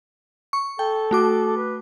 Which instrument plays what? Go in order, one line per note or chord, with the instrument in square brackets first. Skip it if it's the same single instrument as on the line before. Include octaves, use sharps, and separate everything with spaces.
[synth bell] C#6
[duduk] A4 [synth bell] G5
[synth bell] A3 F#4 D6
[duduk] B4